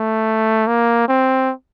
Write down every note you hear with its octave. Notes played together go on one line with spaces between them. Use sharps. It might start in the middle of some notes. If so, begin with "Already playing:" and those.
Already playing: A3
A#3
C4